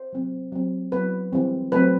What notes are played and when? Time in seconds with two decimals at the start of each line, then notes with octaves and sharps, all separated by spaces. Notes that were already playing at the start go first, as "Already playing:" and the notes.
Already playing: C5
0.13 F#3 C4
0.52 F#3 C4
0.92 F#3 B3 B4
1.33 E3 G3 C4
1.72 F#3 A3 C4 B4